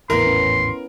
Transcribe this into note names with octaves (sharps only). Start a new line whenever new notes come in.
G#1 E2 A2 B3 E4 A#4 C6
C#4